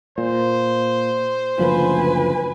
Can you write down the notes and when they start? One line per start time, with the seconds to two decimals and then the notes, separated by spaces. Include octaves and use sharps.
0.18 A#2 C5
1.59 F#1 D2 F3 B4 G#5